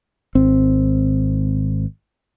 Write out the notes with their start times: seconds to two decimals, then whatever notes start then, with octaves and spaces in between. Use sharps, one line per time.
0.35 G#1 C4